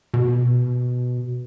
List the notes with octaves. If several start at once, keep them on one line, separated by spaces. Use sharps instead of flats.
B2